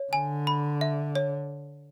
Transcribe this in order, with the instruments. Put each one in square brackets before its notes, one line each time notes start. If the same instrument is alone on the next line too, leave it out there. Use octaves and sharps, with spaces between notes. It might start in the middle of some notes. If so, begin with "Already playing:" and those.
Already playing: [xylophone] C#5
[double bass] D3 [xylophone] G#5
[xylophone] B5
E5
C#5